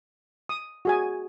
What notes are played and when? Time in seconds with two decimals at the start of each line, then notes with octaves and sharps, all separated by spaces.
0.49 D#6
0.85 F#4 G#4 G#5